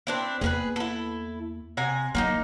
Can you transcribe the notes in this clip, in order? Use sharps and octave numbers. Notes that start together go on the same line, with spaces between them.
C4 D4 E4
E2 A#3 G#4 A#4 B4
E4 A4
C3 G#5 A#5
D#3 F#3 A#3 C4 D#4